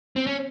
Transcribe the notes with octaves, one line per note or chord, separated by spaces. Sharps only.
C4
C#4